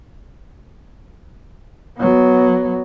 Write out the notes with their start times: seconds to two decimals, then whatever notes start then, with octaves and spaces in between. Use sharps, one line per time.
1.98 F#3 B3